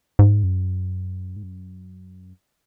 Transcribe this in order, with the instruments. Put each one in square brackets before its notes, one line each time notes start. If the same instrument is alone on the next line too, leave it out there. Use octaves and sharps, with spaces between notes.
[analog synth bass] G#2
F#2
G#2
F#2